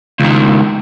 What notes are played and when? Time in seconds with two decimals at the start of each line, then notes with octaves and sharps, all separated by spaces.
0.20 C#2 D#3